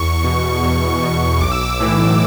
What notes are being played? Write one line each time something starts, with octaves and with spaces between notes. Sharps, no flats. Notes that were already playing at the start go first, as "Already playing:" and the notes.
Already playing: E2 C#6
B2
E2
B2
B1 D6
E6
D6
A2 E3